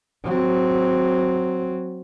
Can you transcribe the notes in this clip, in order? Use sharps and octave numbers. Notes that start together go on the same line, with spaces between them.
F#3 C4